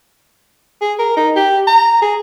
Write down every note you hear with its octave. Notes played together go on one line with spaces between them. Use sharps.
G#4
A#4
D#4
G4
A#5
G#4